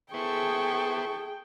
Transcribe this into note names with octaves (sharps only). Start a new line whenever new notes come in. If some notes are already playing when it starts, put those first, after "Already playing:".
B3 E4 G#4 A4 C5 G5 C#6